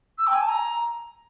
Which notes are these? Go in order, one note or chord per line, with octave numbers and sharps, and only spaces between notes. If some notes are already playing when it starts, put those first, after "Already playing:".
E6
G5
G#5
A5
A#5